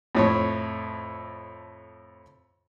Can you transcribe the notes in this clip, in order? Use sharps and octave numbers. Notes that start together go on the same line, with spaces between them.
F2 A2 C#5